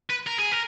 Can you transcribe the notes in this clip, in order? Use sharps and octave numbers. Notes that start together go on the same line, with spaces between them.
B4
A#4
G#4
A#4